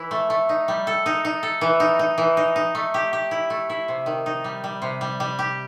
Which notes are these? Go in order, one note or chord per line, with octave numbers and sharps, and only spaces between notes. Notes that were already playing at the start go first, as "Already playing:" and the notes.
Already playing: E3 E4
A3
A3
D#4
G3
A4
D#4
D#4
A4
E3
D#4
D#4
E3
D#4
D#4
A3
G4
G4
E4
A3
E4
C3
D#3
D#4
G3
G3
C3
G3
G3
G4